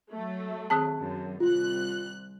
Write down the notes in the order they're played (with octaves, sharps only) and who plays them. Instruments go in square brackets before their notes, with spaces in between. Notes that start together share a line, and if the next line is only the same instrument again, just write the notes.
[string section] F#3 A3
[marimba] D#3 C4 G#4 [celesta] A5 F#6
[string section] F#2
[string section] C2 F#6 [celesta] F4